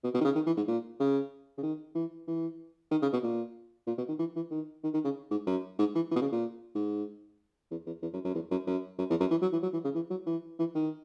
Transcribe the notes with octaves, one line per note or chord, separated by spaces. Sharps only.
B2
B2
D#3
C#3
D#3
E3
G#2
A#2
C#3
C#3
D#3
E3
E3
D#3
C#3
B2
A#2
A#2
B2
D#3
E3
E3
D#3
D#3
D#3
C#3
G#2
F#2
G#2
E3
E3
B2
C#3
A#2
G#2
E2
E2
E2
F#2
F#2
E2
F#2
F#2
F#2
E2
F#2
E3
F#3
E3
F#3
E3
C#3
E3
F#3
E3
E3
D#3